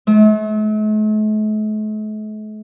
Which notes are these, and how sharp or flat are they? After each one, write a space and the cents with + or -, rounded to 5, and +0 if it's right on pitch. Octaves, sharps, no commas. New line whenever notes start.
A3 -45